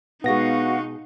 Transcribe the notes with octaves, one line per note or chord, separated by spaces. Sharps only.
B2 G#3 B3 D#4 F#4 F5 A#6